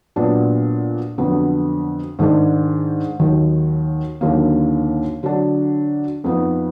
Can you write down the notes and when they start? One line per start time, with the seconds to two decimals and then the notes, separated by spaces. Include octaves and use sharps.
0.16 A#2 F#3 B3 D4
1.18 F2 D3 F#3 B3
2.19 G#2 D#3 G#3 D4
3.20 D#2 D#3 F#3
4.21 D#2 D3 F#3 A#3
5.23 D3 F#3 D4
6.24 F2 F3 B3 D#4